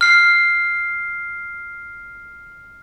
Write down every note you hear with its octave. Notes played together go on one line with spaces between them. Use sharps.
F6 C7